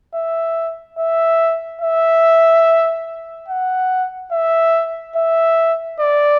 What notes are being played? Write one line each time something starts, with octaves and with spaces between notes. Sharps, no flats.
E5
E5
E5
F#5
E5
E5
D5